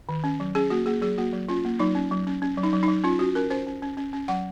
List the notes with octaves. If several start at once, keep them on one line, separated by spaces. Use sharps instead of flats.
D#3
C#4
F#3
C#4 G#4
A#3 F#4
A#3 G#4
F#3 G#4
A#3 F#4
F#3
C#4 F4
A#3
F#3 D#4
C#4
F#3
C#4
C#4
F#3
D#4
F#3
D#4
F#3
C#4 F4
C#4 F#4
C#4 A#4
C#4 C5
C#4
C#4
C#4
C#4
F#3 F#5